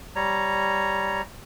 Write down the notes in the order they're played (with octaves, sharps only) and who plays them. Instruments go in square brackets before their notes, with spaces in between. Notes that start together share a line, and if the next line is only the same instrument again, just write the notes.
[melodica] G3 C#5 A#5